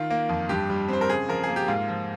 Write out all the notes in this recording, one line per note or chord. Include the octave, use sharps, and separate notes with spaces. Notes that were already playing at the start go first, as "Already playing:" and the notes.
Already playing: D#3 F4
A#3
F2
G2 G4
G3
C4 C5
A#4
C#3 G#4
F3 A#4
A#3 G#4
G4
G#2 F4
F3